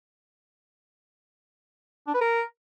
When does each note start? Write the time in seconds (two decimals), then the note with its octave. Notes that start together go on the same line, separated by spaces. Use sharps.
2.07 D4
2.14 B4
2.21 A#4